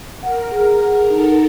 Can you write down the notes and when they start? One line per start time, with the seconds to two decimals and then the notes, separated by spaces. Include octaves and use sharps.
0.22 A#4 F#5
0.51 G#4
0.66 A#4
0.81 F#5
1.10 D#4 A4